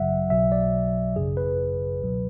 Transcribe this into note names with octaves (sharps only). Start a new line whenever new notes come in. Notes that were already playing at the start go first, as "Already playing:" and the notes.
Already playing: G#1 F#2 C#3 F#3 E5 F#5
B1 B2 F#3 E5
D5
G#1 F#2 C#3 G#4
B4
C#2 B2 F#3